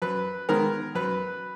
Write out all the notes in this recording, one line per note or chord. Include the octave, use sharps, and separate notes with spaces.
F#2 B4
D#3 G#3 B3 A#4
F#2 B4